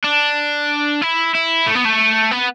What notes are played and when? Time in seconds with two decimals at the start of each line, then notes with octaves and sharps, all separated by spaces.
0.04 D4
1.02 E4
1.35 E4
1.67 A3
1.76 B3
1.85 A3
2.32 B3